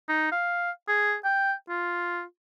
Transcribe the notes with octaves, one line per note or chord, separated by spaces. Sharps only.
D#4
F5
G#4
G5
F4